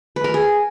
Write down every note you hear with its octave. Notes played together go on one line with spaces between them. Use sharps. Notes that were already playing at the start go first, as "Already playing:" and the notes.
B4
A#4
G#4